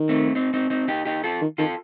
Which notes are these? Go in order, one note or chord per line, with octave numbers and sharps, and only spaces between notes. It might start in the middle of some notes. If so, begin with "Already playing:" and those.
Already playing: D#3
A3 C4
C4 D#4
C4 D#4
C4 D#4
D#4 G4
D#4 G4
F4 A4
D#3
D#3 F4 A4